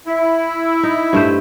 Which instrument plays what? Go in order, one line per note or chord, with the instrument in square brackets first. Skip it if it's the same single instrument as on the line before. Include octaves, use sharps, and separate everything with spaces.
[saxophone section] E4
[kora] D#4
G2 A3 C5